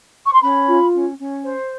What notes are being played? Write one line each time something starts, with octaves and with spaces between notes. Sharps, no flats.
C#6
C6
C#4 B5
F4
C#4
C#4
C5